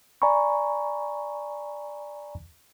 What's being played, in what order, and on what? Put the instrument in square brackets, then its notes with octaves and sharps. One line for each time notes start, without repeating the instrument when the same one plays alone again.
[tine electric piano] D5 G#5 A#5 B5 C#6